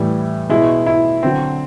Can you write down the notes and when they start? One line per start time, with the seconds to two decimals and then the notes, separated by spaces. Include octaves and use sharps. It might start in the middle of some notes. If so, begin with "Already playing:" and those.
Already playing: A2 E3 G3
0.50 B2 G#3 E4
0.86 E4
1.23 D3 F#3 C4